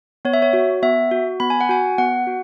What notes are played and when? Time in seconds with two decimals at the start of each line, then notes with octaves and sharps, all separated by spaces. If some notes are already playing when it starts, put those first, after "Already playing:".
0.25 B3 C#5
0.33 E5
0.42 C#5
0.53 F#4
0.82 B3 E5
1.11 F#4
1.40 B3 B5
1.50 G#5
1.61 F#5
1.69 F#4 G#5
1.98 B3 F#5
2.27 F#4